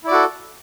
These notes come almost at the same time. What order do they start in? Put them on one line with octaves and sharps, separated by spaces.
E4 D5 F#4 A4